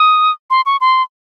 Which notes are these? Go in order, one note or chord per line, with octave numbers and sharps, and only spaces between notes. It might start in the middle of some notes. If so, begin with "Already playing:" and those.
Already playing: D#6
C6
C#6
C6